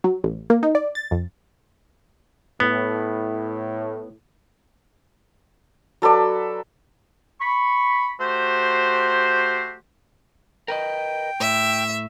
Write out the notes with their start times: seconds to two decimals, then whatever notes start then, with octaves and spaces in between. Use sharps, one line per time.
0.04 F#3
0.24 A1
0.50 A#3
0.63 D#4
0.75 D5
0.95 A6
1.11 F2
2.60 A2 B3
6.02 F#3 A4 B4 D5
7.40 B5 C#6
8.20 A3 F#4 G4 C5
10.68 A#4 B4 D#5 G5
11.40 A2 E5